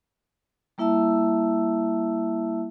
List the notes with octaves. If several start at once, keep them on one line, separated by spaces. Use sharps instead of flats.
G3 A#3 E4 E5 A5 E6